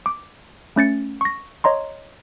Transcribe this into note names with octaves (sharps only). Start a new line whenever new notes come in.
D6
A3 C#4 A6 C#7
C#6 A#6
C#5 D#5 A#5 C6